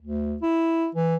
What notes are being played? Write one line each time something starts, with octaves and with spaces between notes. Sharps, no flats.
D2
E4
E3